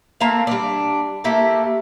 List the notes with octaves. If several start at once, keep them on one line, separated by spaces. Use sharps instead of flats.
A3 A#3 C4 F5
G3 D4
A3 A#3 E4 G4